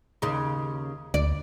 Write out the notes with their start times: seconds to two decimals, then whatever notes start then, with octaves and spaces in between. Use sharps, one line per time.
0.22 D#2 C#3
1.14 D2 D5